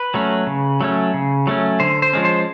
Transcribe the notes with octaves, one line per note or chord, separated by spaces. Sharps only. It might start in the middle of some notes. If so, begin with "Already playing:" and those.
Already playing: B4
F#3 A3 C#4
C#3
F#3 A3 C#4
C#3
F#3 A3 C#4
D3 C5
C5
F3 G#3 C#4
C5